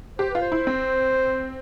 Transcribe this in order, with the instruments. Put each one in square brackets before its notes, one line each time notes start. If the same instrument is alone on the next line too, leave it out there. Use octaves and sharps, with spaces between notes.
[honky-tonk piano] G4 [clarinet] C5
[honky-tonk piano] F4 [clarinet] B4
[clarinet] C5
[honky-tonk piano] E4
C4